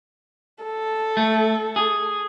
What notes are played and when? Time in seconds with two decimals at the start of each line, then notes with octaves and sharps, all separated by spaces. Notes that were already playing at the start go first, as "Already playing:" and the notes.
0.64 A4
1.17 A3
1.76 G#4